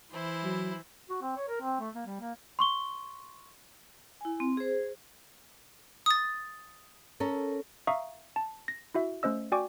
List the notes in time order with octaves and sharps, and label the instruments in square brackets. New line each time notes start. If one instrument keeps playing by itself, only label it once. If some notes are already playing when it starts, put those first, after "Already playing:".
[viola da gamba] E3 [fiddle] E4 C5
[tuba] F#3
[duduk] F#4
C4
C#5
A#4
C4
A3
A#3
G3
A#3
[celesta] C6 C#6 G7
[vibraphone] E4 G#5
C4
G#4 C5
[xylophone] D#6 A6
[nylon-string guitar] C#4 A4 A#4
[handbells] E5 F5 A#5 C#6 D#6
A5
A#6
E4 F#4 E5
A3 C#4 C5 D#5 E6
F#4 D5 G5 G#5 C#6 D6